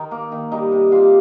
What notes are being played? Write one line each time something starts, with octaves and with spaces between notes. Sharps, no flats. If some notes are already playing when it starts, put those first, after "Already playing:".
Already playing: D#3 D#4
A#3
D#3
G3 D#4 D#5
C3
C3 F4 F5